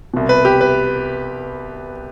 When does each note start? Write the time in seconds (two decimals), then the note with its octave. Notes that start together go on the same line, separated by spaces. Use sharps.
0.14 C2 B2
0.29 B4
0.45 G4
0.61 B4